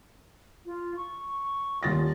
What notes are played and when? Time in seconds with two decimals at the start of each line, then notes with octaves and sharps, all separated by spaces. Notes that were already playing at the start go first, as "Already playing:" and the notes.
0.65 F4
0.96 C#6
1.83 D#1 F4 A6 A#6